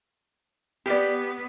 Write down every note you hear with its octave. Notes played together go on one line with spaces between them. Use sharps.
B3 G4 D5